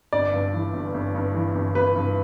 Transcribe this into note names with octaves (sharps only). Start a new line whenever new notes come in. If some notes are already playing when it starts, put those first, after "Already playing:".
G1 D5
G2
E3
G1
G1
G2
E3
G1
G1 B4
G2